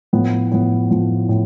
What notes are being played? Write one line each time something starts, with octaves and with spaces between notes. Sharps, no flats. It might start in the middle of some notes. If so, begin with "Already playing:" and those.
A2 F3 B3
A2 F3 B3
A2 F3 B3
A2